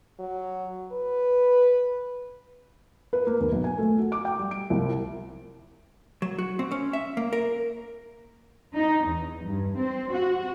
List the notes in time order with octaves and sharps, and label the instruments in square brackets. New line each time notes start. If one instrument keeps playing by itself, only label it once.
[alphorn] F#3
B4
[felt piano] B4
A#3
D#2
B1
G#5
A3
F#4
D6
G5
G3
D7
C2
[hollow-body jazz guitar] F#3
F#4
C4
C#4
E5
A#3
A#4
[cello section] D#4
E2
G2
C4
F#4